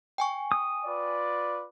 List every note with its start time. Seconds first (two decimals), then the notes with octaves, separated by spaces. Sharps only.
0.18 G5 G#5 C#6
0.52 D#6
0.86 F4 B4 D5